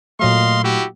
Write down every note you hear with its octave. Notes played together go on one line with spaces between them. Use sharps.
A#2 F#3 A3 D#5 F5 C6
E4 F#4 G4